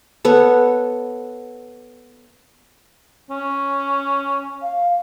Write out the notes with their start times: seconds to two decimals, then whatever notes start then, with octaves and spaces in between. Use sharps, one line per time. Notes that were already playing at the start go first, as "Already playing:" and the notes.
0.25 B3 A4 C#5 F#5
3.30 C#4
4.62 F5